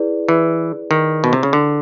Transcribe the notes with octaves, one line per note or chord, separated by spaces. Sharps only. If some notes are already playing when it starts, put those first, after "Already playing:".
Already playing: E4 G#4 B4 D5
E3
D#3
B2
C3
C#3
D3